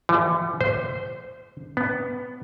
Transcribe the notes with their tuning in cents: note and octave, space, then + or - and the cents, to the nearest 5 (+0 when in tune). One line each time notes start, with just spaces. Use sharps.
E3 +45
C5 -20
B3 +10